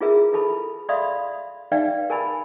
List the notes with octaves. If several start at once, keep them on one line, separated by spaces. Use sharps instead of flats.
E4 F4 G#4 A#4 B4 E5
E4 A4 A5 B5
D5 E5 F5 B5 C6 D#6
D#4 B4 D5 E5 F5 G5
A#4 G#5 A5 B5